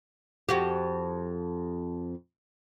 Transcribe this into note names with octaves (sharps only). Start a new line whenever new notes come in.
F2 F#4 G4